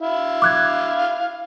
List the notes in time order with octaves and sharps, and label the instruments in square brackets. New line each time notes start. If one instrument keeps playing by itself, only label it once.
[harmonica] E4 F5
[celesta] D6 F#6 G#6